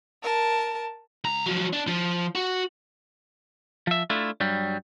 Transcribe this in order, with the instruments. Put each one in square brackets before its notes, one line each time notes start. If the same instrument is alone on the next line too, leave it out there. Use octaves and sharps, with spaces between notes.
[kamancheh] A#4 A5
[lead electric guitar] C#2 A#5
F3 F#3
D4
F3
F#4
[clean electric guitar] F3 E5
A3 D4 E4 F4
G2 F#3 G3